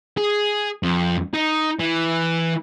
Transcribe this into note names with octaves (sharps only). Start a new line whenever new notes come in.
G#4
F2
D#4
E3